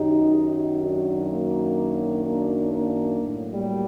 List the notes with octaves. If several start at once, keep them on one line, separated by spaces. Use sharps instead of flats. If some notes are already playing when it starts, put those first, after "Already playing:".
Already playing: F#2 D#3 F#3 D#4 G4
D#4 G4
D4 F#4
A#3 D4
A#3 D4
A#3 D4
A2 F#3
G3 A#3